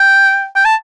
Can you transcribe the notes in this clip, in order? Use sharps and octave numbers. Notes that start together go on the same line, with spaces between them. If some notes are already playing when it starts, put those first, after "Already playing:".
Already playing: G5
G5
A5